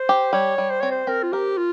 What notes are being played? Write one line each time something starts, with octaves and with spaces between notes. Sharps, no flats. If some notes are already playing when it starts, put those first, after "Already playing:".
Already playing: C5
G4
G3 C#5
G3
C5
C4 C#5
C5
C4 A#4
F4
G4 A#4
F4